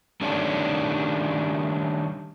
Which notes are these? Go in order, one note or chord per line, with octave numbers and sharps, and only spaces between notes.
D#3 G3 A3 C#4 D4